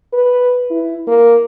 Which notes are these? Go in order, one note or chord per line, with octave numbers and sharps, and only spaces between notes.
B4
E4
A#3